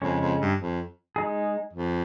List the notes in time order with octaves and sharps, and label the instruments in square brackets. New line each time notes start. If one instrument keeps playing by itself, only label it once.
[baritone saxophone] F2 [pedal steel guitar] C#3 G#3 C#4
[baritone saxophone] F2
G2
F2
[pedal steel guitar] G#3 D#4 G#4
[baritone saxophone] F2